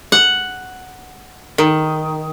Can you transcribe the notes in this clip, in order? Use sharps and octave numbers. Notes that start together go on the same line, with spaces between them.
F#5
D#3